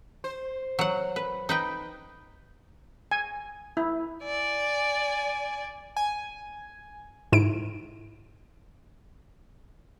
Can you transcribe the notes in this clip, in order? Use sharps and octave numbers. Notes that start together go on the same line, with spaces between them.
C5
F#3 F#5
B4
D#4 B4 G5
G#5
E4
D5 G#5
G#5
G#2 E4 D7